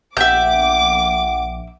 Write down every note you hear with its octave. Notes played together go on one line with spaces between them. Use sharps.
A#1 E5 F#5 G5 D6 G6